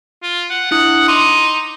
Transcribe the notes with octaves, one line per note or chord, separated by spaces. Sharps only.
F4
F#5
D4 E4 F#5 D#6
D#4 C6 D6